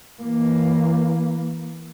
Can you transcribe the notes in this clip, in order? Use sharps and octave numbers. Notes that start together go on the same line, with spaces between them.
E3 A#3